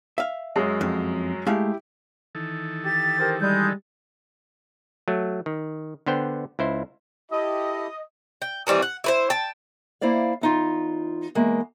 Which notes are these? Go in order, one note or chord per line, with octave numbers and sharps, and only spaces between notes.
E5 F5
F#2 F#3 G#3
F2
G#3 A3 E4 G4 F5
D#3 E3 A4
G4 A6
G4 A#4 C5
G3 G#3 G6
F#3 A3
D#3
D3 B3 C5 G5
C#2 E4 C5
E4 G4 A4 D#5
G5
D#3 E3 G3 C4
F#5
E4 B4 C5
G5 A5
A#3 E4 C5 D5 F5
E2 D#4 F4
E2 G#3 A#3